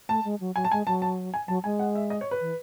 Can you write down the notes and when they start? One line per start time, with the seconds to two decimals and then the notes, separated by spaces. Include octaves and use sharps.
0.09 A3 A5
0.24 G#3
0.40 F#3
0.55 F#3 G#5
0.65 A5
0.72 G#3 G#5
0.87 F#3 A5
1.02 A5
1.34 G#5
1.48 F#3 A5
1.64 G#3 G#5
1.79 F#5
1.95 E5
2.10 D#5
2.21 C#5
2.31 B4
2.41 E3